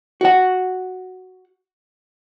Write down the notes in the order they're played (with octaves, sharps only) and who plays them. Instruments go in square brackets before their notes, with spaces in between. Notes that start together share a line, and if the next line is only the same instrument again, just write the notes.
[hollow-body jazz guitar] F#4 F#5